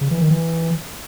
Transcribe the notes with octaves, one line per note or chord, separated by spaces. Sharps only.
C#3
E3
D#3
E3